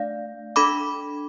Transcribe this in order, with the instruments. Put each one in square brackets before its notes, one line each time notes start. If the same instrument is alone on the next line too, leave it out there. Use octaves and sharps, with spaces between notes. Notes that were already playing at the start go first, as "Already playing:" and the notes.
Already playing: [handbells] A3 D4 D5 F5
D4 A4 B5 D6